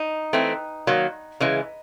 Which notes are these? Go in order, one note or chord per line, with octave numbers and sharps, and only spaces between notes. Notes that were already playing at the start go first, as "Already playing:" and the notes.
Already playing: D#4
E3 A3 C4
D#3 F#3 A#3
C#3 E3 G#3